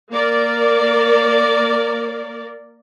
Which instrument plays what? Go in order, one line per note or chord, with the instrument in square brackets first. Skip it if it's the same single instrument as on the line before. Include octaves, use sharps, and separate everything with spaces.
[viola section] A#3 A#4 D5